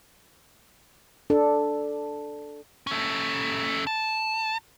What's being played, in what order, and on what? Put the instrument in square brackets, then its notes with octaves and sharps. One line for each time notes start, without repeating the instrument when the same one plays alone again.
[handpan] D4 A4
[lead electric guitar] C#4 A4
A5